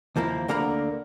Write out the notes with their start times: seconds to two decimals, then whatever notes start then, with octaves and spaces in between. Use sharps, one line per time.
0.16 D#2 F3 A#3 E4
0.48 D2 D3 A#3 A#4 A#5 B5